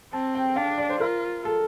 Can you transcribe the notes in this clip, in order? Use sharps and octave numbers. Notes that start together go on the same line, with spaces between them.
C4 A5
G5
D4 F5
D5
C5
F4 A#4
A4